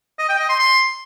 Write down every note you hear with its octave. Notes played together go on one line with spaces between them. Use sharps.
D#5
G5
D#5
C6
C6